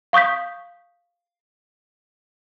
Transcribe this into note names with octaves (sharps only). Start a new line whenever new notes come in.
F5 C#6 D#6 G6 B6